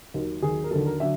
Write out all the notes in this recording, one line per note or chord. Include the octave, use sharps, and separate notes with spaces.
D#2 D#3 F#3
D#2 D#3 F#3 G#4
A#4
D#2 D3 F#3 A4
A#4
D3 F#3 E5